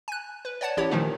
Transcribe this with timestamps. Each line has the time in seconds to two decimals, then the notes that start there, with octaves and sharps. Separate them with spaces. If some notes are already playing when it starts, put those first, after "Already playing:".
0.08 G#5 F#6
0.45 B4
0.61 C#5 D5 F#5 A5 G#6
0.77 A1 E4 G4 C#5
0.91 A#2 D#3 F3 A3 D#4